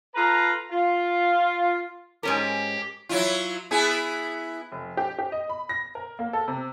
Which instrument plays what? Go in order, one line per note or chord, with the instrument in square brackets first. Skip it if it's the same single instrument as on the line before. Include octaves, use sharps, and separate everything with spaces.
[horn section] F4 A4 B4 A#5
F4
[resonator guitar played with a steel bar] G#2 C#4 A#4 [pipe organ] G4
[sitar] F#3 E4 F4
B3 E4 G#4
[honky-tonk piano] F1
G4
G4
D#5
B5
A#6
A#4
A#3
A4
C3